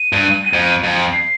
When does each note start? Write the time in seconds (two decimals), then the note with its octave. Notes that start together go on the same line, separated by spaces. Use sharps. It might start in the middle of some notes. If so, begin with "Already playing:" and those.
Already playing: D#7
0.13 G2
0.53 F2
0.84 F2
1.13 C7